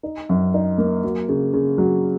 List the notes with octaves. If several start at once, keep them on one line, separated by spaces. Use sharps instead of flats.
D#4
F#2
D#4
A#3
F#3
C#3
C#3
F#3